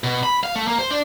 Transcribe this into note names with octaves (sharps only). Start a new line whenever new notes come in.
B2
B5
F5
A3
A#3
C5
D4